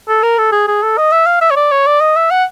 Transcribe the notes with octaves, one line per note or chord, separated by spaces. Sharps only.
A4
A#4
A4
G#4
G#4
A4
D#5
E5
F5
E5
C#5
D5
C#5
D5
D#5
E5
F#5